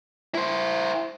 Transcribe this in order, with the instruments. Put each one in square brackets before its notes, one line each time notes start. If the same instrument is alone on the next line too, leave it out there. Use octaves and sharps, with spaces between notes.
[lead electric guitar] E4 C5